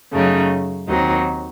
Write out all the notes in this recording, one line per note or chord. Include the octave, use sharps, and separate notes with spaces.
F#2 C#3 A3 D#4
D#2 D#3 F#3 C4 D#4